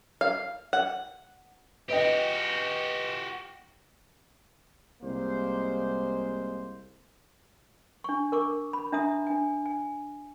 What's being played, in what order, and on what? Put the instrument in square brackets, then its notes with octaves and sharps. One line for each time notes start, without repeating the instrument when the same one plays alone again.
[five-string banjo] F5
F#5
[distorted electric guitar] F#4 G4 [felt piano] B4 D#5 G5
[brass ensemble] C2 G#3 A#3 C5
[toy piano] D4 C#6
A#4 C#6 D6
B5
D4 E5 A#5 D#6
D4 G#5
G#5